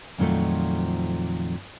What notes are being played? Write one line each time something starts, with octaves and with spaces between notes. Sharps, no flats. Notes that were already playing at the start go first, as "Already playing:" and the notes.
F2 A#2 D#3 F3 F#3 A3